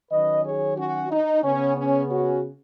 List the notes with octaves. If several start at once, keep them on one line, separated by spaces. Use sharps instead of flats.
D#3 F#3 C#4 B4 D#5
G#4 C#5
C#4 F#4
D#4
C#3 B3 C#4
C#4
C#4 F#4